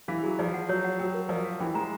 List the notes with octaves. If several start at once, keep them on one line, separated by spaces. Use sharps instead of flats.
E3 F5
F#3 G#4
F3 D5
F#5
F#3 C#5
F#5
F#3 G5
A#4
F3 D5
F5
E3 G5
G#3 A#5